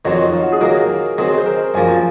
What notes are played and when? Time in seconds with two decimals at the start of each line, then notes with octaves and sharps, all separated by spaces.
0.05 F2 D#3 F#3 C4 C#5
0.23 D#4
0.33 F4
0.43 F#4
0.52 G#4
0.61 D#3 F#3 A#3 A#4
1.18 D#3 F#3 C4 G#4
1.38 C5
1.46 A#4
1.74 F#2 F3 A#3 G#5